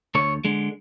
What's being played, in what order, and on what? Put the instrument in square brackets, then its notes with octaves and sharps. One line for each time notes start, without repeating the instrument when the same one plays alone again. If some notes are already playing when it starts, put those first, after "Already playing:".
[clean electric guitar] D2 A4 C#5
D3 G#3